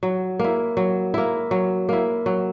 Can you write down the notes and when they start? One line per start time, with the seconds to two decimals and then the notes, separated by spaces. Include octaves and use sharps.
0.03 F#3
0.39 A#3 E4
0.77 F#3
1.14 A#3 E4
1.51 F#3
1.89 A#3 E4
2.26 F#3